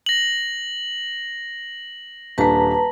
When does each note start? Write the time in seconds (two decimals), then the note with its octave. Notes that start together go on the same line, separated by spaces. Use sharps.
0.06 A#6 F#7
2.38 D#1 D4 B4 A5 A#5 B6